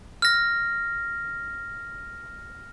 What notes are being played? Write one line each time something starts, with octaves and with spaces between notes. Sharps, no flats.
F6 A#6